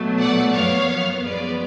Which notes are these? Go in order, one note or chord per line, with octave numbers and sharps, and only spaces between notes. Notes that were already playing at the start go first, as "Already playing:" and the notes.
Already playing: B2 F#3 A3
D5 F#5
F#2 F3 B3 C#5 F5
F#2 F3 G#3 B3 B4 D5